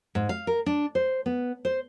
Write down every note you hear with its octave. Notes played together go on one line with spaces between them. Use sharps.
G#2
F5
A#4
D4
C5
B3
C5